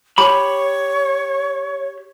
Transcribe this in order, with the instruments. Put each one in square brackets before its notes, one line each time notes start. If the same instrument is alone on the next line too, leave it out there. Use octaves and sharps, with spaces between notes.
[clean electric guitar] G4 B5 [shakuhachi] C#5